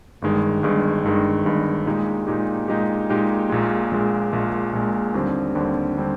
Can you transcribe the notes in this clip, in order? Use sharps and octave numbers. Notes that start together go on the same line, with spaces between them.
G1 G2 D#3 G#3
G1 G2 D#3 G#3
G1 G2 D#3 G#3
G1 G2 D#3 G#3
A#2 G#3 D#4 G4
A#2 G#3 D#4 G4
A#2 G#3 D#4 G4
A#2 G#3 D#4 G4
A#1 A#2 G#3
A#1 A#2 G#3
A#1 A#2 G#3
A#1 A#2 G#3
D#2 D3 G3 C4
D#2 D3 G3 C4
D3 G3 C4